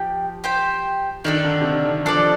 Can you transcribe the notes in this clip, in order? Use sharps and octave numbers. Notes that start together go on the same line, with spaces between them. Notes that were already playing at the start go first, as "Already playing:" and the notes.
Already playing: F3 G4 G5
G4 C5 G5
D#3 D4 A4 D5
D3
C3
D3
D#3
F3 D4 A4 D5
F3